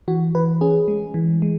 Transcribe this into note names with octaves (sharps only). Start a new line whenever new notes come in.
E3 F#4
E3 B4
C#4 G#4
G#3
E3
G#3